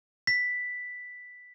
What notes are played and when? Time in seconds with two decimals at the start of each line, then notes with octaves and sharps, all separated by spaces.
0.27 B6